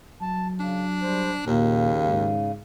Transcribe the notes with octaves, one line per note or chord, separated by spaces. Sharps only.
F#3 A5
C#3 D4
G3 C5
D#2 A#2 C#3
G#2